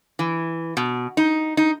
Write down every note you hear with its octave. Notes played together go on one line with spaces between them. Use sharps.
E3
B2
D#4
D#4